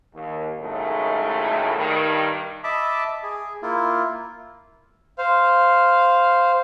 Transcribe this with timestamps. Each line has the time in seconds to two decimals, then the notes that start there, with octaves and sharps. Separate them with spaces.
0.14 D#2
0.60 C2 F#2 A2 D#3 G#3 A3
1.77 G2 D#3 G3
2.64 D#5 E5 A5 B5 D6
3.23 G#4
3.62 A#3 E4 F4
5.18 C5 F5